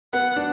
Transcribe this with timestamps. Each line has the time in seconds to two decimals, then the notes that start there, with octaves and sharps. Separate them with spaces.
0.13 B3 F#5
0.36 D4